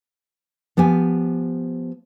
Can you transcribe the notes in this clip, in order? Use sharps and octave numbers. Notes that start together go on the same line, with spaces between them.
F3 B3 G4 G#5